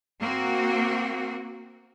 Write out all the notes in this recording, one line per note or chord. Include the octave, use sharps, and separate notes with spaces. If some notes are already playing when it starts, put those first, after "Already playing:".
A#3 C4 F#4